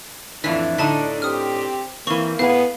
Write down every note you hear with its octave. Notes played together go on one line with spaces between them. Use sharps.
F2 A2 E3 D4 E5 B6
A2 D3 D#4 A5 B6
C4 G4 D#6 F6
E3 A#3 C4 A#4 C#6
A2 B3 G#4 F5